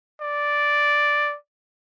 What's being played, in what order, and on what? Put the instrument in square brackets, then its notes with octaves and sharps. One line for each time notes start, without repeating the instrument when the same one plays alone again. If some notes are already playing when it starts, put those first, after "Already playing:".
[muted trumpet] D5